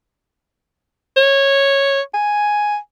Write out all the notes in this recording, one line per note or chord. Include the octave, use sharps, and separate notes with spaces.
C#5
G#5